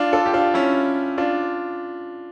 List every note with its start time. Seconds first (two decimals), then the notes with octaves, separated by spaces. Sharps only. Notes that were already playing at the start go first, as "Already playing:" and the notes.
Already playing: D4 F4
0.13 F4 A4
0.26 G4
0.34 D4 F4
0.54 C#4 E4
1.18 D4 F4